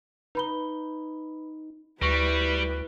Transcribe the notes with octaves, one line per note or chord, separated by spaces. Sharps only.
D#4 B4 B5 G7
D2 G3 E4 B4 C#6 A#6